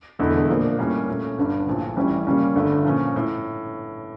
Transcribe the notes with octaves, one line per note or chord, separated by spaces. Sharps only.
E1 E2 D3 A3 E4
A#2 F3 A#3 D4
A2 G3 A#3 C#4
A#2 A3 C#4
G1 G2 D3
A#1 A2 F3
A1 A2 E3 G3 C#4
C#3 G3 A#3 C#4 F4
G1 G2 D3 A3
A#2 F3 C#4
A2